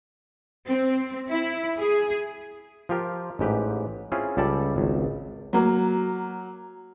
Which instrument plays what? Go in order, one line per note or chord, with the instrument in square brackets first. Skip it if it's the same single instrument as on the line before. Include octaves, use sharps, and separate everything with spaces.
[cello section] C4
E4
G#4
[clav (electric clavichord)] F3 F4 G4 A#4
A1 G#2 G4 B4
C4 C#4 E4 F4 G#4
C#2 G3 A4 D5 A5
G#1 C#2
[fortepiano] F#3 A#3